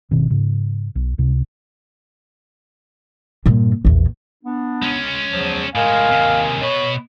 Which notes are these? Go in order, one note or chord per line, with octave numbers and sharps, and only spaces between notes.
G1 B2 D#3 C4
G#2 C#3
B1
C#2 C3
G2 A#2
A#1 E2
B3 D4
G#3 C#4
E2 F3 F#3
A2 G#3 A#4 D#5 F5 G#5
D#2 C3
B2 B4 C#5